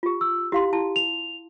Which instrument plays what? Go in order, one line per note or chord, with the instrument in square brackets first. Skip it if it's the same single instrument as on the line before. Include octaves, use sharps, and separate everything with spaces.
[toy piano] F4 G4
[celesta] E6
[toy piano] E4 F5 C6 [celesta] G4
[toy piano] E4 A5
[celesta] F7